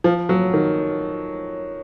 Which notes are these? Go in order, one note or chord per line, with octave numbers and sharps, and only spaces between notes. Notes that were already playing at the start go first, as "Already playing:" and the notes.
F3
F#3
D#3